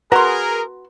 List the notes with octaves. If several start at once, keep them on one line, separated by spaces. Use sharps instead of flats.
F#4 G#4 A#4 B4 A#5 C6